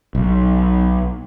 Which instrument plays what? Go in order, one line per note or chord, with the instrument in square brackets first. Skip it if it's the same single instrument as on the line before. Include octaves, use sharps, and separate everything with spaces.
[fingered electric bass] B1